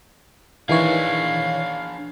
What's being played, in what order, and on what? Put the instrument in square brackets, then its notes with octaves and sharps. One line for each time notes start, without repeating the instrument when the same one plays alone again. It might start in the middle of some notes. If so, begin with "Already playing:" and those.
[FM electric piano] D#3 E3 C#5 [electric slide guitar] D4 G#4 [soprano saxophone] F5